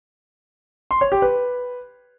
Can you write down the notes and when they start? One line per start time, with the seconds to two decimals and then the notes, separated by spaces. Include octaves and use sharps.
0.91 C6
1.01 C#5
1.12 G4
1.22 B4